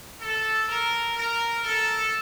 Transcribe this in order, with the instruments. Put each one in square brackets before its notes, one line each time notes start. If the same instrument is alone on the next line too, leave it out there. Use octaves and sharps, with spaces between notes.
[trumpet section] A4
A#4
A#4
A4